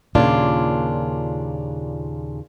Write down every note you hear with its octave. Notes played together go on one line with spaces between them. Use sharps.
D#2 A#2 C#3 D4 F4